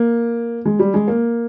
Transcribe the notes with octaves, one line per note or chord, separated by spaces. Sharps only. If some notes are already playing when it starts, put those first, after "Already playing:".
Already playing: A#3
G#3
G3
G#3
A#3